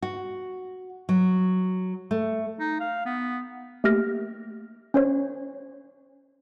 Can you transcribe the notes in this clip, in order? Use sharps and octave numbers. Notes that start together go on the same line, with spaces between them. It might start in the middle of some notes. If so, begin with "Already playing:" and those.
F#4
F#3
A3
D#4
F5
B3
A3 A#3 G4 F6 A#6
C#4 C5 C#5